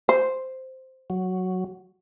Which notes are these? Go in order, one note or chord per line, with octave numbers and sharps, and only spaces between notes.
C5
F#3